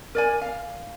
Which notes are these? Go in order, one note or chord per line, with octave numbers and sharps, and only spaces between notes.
A#4 D5 G#5
F5